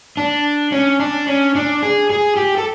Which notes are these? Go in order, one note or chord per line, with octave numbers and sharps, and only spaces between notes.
D4
C#4
D4
C#4
D4
G#4
G#4
G4
A4